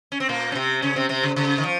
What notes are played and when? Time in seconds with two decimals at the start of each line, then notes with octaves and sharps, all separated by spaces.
0.12 C#4
0.20 C4
0.29 A#2 A#3
0.52 C#4
0.55 C3 C4
0.82 C#3 C#4
0.96 C3 C4
1.09 C3 C4
1.23 C#3
1.36 C#3
1.58 D#3
1.64 F3